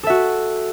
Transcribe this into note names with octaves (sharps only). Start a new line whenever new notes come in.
F#4 A4 E5